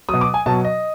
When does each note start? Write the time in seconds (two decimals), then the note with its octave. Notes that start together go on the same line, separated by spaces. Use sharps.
0.09 B2 F#3 D#6
0.21 D6
0.34 G#5
0.46 B2 F#3 A5
0.65 D#5